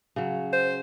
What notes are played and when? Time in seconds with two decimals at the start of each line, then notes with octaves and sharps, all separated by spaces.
0.16 C#3 F#3
0.53 C5